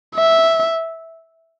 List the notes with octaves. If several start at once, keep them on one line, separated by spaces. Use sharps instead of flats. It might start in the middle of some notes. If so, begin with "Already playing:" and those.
E5